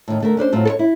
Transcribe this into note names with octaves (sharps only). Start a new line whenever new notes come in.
A2 D#3
D3 A3 A#4
C#4 D4 B4 C5
A2 F#3 C4 F4
A4 C#5
E4